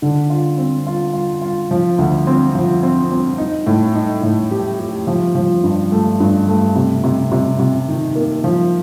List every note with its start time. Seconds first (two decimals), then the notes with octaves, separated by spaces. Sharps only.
0.02 D3
0.30 F4
0.58 C4
0.87 F4
1.13 F4
1.41 F4
1.71 F3
1.98 D2
2.27 C4
2.55 F3
2.83 C4
3.11 C4
3.38 D#4
3.66 A2
3.95 D#4
4.23 A2
4.51 G4
4.80 G4
5.07 F3
5.35 F3
5.63 G2
5.92 A3
6.20 G2
6.48 A3
6.76 C3
7.04 C3
7.32 C3
7.59 C3
7.88 D#3
8.15 A#3
8.44 F3